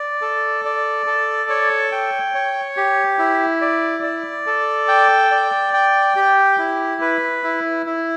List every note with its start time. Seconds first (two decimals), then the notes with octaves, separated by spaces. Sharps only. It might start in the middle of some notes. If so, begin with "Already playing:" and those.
Already playing: D5
0.22 A4
0.65 D5
1.06 A4
1.50 C#5
1.92 G5
2.35 C#5
2.77 G4
3.19 E4
3.61 D5
4.03 D5
4.46 A4
4.88 G5
5.31 D5
5.74 G5
6.16 G4
6.59 E4
7.01 B4
7.44 E4
7.86 E4